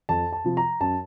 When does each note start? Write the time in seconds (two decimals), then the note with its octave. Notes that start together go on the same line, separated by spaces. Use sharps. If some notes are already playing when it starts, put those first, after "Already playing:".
0.09 F2 A5
0.32 A5
0.44 C3 F3
0.57 A#5
0.80 F#2 A5